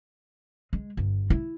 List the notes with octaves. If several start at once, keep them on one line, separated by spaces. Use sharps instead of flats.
G#3
G1
E4